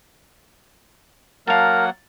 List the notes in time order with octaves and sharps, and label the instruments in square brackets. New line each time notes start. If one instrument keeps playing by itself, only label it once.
[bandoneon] F#3 A#3 F#5 [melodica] A#4 [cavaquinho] F5 A5